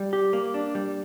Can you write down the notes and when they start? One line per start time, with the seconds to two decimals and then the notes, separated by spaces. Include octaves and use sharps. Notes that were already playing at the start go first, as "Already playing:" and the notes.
Already playing: G3
0.13 G4
0.33 A#3
0.54 D4
0.75 G3